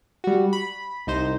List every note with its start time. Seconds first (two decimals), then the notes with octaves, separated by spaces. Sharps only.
0.24 G3 F#4
0.53 B5
1.07 C2 D#4 C5